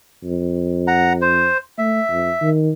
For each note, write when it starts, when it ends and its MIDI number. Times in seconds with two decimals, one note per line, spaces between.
0.24 1.48 41
0.88 1.13 78
0.88 1.13 82
1.22 1.57 72
1.78 2.01 57
1.78 2.50 76
2.10 2.31 41
2.41 2.72 51